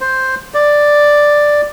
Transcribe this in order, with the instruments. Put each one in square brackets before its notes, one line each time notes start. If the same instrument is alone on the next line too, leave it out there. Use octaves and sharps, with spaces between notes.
[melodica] C5
D5